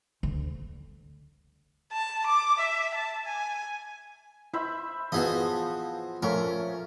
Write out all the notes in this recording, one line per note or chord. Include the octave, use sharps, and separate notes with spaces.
D2
A5
D6
E5
A5
G#5
E4 C5 E5 B5
E3 F3 B3 F#4 G#4 D#5
F3 A3 C#4 F4 A#4